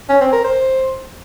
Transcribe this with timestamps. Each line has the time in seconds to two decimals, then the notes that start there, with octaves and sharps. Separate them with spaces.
0.09 C#4
0.21 C4
0.32 A#4
0.44 C5